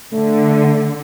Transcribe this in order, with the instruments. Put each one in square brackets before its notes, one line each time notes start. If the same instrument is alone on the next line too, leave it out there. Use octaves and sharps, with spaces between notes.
[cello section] D3 [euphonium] A3